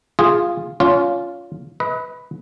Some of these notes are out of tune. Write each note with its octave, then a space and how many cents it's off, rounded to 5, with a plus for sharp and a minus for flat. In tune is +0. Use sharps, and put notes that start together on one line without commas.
F4 +0 G#4 -15
C#4 +30 F4 +0
B4 +0 D#5 +40